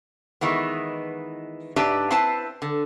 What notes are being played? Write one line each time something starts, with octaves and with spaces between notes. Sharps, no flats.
D#3 E3 G#3 B3
G#2 D4 G4 B4 D5 E5
C4 E4 B4 C5 A5
D3